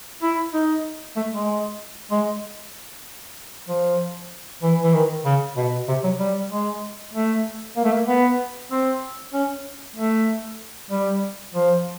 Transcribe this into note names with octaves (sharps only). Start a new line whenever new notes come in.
E4
D#4
A3
G#3
G#3
F3
E3
E3
D#3
C#3
B2
C3
F#3
G3
G#3
A3
A#3
A3
A#3
B3
C4
C#4
A3
G3
F3